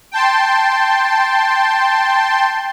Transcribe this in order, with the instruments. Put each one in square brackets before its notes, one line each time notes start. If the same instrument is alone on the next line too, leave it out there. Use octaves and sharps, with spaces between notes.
[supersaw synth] G5 A5 C6